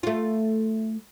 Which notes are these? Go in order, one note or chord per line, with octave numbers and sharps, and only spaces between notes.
A3 F4